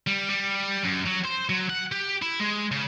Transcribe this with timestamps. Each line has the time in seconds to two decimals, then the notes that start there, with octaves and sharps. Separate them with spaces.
0.07 G3
0.30 G3
0.84 F#2
1.06 F#3
1.24 C5
1.49 F#3
1.70 F#5
1.92 G4
2.22 E4
2.40 G#3
2.72 C#3